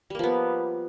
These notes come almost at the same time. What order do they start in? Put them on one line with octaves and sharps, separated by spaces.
G3 A#3 F3 B3